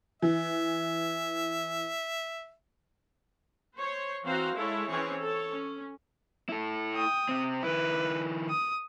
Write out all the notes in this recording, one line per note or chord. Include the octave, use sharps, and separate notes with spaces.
E3 E5
C5 C#5
E3 C4 F#4 C5 F5 A#5
G#3 E4 A4 C#5
E3 C4 C#4 G#4 C#5
A4 C#5
C#4
E4 A4
G5 D#6
C3 C4
D#3 E4 B4
D#6